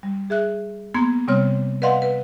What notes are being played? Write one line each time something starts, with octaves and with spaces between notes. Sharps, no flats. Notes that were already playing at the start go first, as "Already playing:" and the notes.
G3
G#4 E5 F#6
A#3 B3 C6 G#6
C3 G3 C4 C#5 F6
B4 D5 D#5 F5 F#5 C6
B4